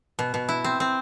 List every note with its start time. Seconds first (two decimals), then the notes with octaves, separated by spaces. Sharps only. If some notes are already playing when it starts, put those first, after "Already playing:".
0.19 B2
0.34 B2
0.49 E4
0.64 C4
0.80 C4